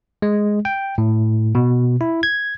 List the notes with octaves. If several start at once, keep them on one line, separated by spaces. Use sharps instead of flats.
G#3
G5
A2
B2
E4
G#6